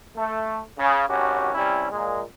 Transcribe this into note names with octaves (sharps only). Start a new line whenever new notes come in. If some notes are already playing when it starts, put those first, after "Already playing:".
A3
C#3
G#1 C#4 F#4 G4
C3 G3 C#4 E4
A#2 G#3